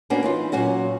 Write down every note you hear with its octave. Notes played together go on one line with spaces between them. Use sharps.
A#3 B3 C#4 D4 F#4
E3 D#4 F4
A#2 F#3 C#4 F#4